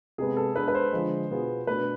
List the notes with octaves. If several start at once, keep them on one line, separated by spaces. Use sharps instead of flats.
C3 G#3 B3 G#4
A4
G#3 B3 D4 B4
B4
C5
D3 F3 G#3
B2 B3 F4 G#4
B2 A3 D4 B4